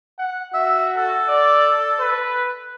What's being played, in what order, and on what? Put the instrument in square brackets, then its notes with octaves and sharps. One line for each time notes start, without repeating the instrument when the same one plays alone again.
[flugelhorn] F#5
[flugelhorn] F#4 [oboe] E5
[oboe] A4
[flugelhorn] D5
B4